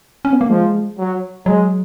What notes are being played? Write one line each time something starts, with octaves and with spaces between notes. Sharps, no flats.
C#4
B3
A#3
F3 G#3
F#3
F#3 G#3